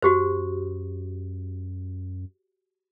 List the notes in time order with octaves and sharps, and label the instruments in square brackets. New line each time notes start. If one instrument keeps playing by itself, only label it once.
[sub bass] F#2 [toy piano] F#4 G4 C5